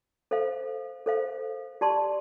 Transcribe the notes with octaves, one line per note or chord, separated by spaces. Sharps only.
A4 C5 F5
A4 C5 F5
G4 D5 A5 C6